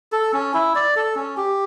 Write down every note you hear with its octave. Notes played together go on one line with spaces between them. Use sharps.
A4
C#4
E4
D5
A4
C#4
G4